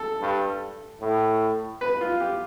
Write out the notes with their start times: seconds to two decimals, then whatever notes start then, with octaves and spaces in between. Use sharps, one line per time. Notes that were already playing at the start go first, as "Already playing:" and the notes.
Already playing: A4
0.21 G2
1.01 A2
1.81 B4
2.01 F4
2.20 G4